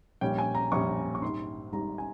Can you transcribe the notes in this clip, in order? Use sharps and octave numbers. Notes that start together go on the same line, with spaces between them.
A#1 A#2 G3 C#4 G5
G#5
A#5
A#1 A#2 G3 C#4 C#6
C#6
G#1 G#2 G3 C6
G#1 G#2 G3 A#5
G#5